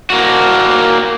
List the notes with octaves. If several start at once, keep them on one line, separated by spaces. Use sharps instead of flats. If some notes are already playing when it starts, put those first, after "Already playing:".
A#3 F#4